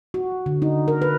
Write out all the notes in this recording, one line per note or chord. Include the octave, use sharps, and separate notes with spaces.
F#4
D3
D#4
A#4
B4